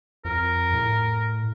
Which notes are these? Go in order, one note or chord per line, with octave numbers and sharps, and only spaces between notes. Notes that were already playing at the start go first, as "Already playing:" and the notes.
F2 A#4
A2